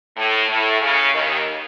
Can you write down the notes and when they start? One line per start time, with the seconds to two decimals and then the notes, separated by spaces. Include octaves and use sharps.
0.16 A2
0.48 A2
0.80 C#3
1.13 D#2 D#3